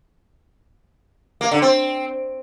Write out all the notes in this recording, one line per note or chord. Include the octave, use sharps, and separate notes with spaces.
A#3
D3
C4